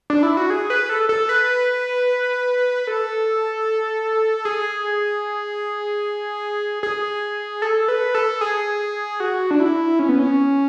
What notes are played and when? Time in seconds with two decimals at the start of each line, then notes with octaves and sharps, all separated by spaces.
0.10 D4
0.23 E4
0.37 F#4
0.50 G#4
0.70 B4
0.90 A4
1.09 A4
1.29 B4
2.87 A4
4.45 G#4
6.83 G#4
7.62 A4
7.88 B4
8.15 A4
8.41 G#4
9.20 F#4
9.51 D4
9.60 E4
9.99 C#4
10.09 B3
10.19 C#4